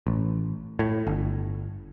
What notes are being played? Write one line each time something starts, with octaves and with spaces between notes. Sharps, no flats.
A1
A2
G1